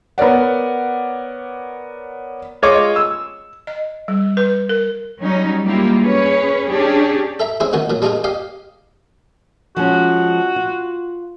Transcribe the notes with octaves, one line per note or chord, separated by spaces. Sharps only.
B3 A#4 C#5 D5 F#5
G#3 F4 C#5 D#5 D6
E6
D#5
G3
B4
A#4
F#3 G3 C#4 D#4
G3 G#3 A#3 E4 F4 G4
C#4 G#4 B4 C#5
C#4 D4 G4 G#4
A4 E5 A#5
G#3 C4 C#4 E4 G#4
C#2 D#3 C#4 F#4 F#5
A#2 F#3
G3 G#3 D4 D#4 F4 G#4
G4 D#5 F5 G5
F3 G#3 C#4 F#4
F4